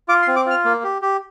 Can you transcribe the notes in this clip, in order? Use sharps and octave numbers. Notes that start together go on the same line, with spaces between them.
F4 D6
C6
C4
D6
F4 F6
A#3
G4
G4